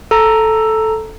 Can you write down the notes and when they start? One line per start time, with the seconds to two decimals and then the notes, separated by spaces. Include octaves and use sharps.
0.11 A4 A#5